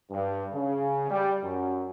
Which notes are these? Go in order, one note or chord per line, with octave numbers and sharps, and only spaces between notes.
G2
C#3
G3
F#2